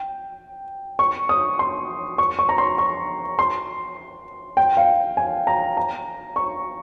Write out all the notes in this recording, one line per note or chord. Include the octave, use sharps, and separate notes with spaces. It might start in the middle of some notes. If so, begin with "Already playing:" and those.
Already playing: G5
C#6
D#6
C6
C#6
C#6
A#5
C6
C#6
C6
G5
F5
G#5
A#5
A#5
C#6